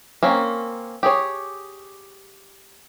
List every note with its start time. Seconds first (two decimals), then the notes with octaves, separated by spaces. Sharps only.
0.23 A#3 C4 C#4
1.03 G4 G#4 C#5